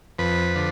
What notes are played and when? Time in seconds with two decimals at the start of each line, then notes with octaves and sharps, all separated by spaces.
0.19 F2 B4
0.55 D3 F3